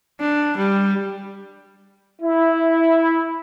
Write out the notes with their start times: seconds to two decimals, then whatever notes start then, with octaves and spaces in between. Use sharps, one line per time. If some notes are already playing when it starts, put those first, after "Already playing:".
0.20 D4
0.57 G3
2.22 E4